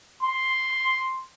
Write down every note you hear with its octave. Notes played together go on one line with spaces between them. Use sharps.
C6